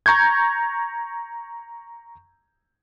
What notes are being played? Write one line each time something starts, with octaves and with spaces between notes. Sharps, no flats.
A#5 C#6 G6 G#6